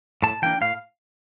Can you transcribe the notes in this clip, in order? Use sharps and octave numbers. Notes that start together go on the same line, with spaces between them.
A2 A5
E3 A#3 D4 G5
A2 F5